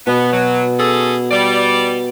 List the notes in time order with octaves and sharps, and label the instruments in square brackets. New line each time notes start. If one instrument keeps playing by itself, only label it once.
[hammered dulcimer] B2 [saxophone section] B3
[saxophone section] F#3
C#4 G#4 A4
G3 D5